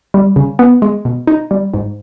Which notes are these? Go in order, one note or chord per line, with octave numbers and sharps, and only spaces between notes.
G3
C#3
B3
G#3
B2
D#4
G3
G#2